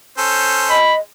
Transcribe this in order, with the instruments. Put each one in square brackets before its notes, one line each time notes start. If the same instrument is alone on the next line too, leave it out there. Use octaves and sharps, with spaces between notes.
[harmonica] C#4 A4 C5
[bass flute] D#5 [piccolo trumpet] B5